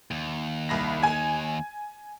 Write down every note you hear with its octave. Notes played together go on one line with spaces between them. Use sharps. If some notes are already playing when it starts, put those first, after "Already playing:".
D#2
C2 B5 A#6
G#5 G#6